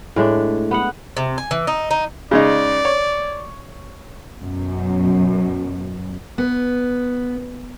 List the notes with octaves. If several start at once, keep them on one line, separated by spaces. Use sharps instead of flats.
A2 G#3 A3 D4
B3 B4 F#5
C3
G#5
E3
D#4
D#4
C#3 G#3 D#4 D5
C#5
F#2 B2
B3